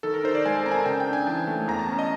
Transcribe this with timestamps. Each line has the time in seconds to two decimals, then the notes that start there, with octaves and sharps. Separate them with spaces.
0.03 D#3 A4
0.14 A#4
0.24 D#4 C5
0.35 D5
0.45 G#3 G#5
0.55 A5
0.66 C4 A#5
0.72 G#5
0.76 A5
0.85 C#3 G5
1.00 G5
1.07 D4
1.13 G#5
1.27 E3 A5
1.48 A3
1.68 E2 A#5
1.79 A5
1.89 C#4
1.99 D#5